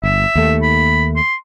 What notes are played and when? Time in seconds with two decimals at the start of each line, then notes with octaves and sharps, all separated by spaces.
0.04 G1 E5
0.35 D#2 A3
0.62 B5
1.16 C6